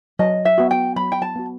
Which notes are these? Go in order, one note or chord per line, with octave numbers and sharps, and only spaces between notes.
F#3 D#5
E5
B3 F#4
G5
F#3 B5
G5
A5
B3 F#4